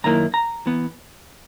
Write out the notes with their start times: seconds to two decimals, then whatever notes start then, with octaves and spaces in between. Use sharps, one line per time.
0.04 F#2 D#3 A#3 E4 A#5
0.34 A#5
0.66 E3 B3